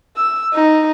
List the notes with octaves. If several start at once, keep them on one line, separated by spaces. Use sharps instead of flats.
E6
D#4